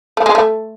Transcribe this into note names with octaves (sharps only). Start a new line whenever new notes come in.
A3
G#3
A3